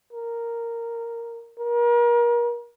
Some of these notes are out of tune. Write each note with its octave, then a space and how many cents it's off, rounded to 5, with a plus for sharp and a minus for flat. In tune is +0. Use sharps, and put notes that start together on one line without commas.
A#4 -5
A#4 +35